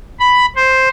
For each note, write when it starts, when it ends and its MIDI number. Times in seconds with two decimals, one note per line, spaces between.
0.20 0.46 83
0.56 0.88 72